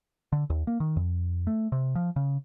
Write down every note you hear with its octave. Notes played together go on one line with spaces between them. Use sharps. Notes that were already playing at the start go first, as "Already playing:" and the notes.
D3
D#2
A#3
D#3
F2
A3
C3
F3
C#3